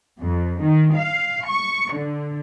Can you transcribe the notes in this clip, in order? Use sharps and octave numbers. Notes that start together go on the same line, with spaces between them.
F2
D#3
F5
C#6
D3